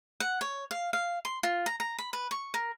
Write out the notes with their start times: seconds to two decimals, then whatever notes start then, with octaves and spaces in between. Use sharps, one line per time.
0.20 F#5
0.41 C#5
0.71 F5
0.93 F5
1.25 C6
1.43 F4
1.66 A#5
1.80 A#5
1.99 B5
2.13 B4
2.31 C#6
2.54 A#4